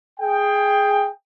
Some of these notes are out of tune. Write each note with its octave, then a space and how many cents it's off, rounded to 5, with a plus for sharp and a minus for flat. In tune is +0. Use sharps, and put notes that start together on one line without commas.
G#4 +0 G5 +15